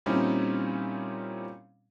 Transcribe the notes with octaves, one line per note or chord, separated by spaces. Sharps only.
A#2 G3 C4 C#4 D#4 E4